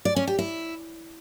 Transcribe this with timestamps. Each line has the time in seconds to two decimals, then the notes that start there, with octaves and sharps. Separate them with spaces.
0.05 D5
0.16 C#4
0.27 G4
0.38 E4